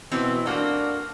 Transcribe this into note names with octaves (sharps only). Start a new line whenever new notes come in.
B2 E3 C4
A3 A#3 D4 F#4